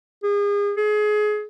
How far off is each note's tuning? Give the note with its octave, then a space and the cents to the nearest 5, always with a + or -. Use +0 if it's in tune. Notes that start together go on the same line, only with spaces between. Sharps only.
G#4 -35
G#4 +25